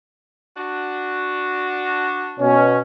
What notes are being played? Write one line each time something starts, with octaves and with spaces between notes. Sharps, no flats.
D4 F#4
B2 C#4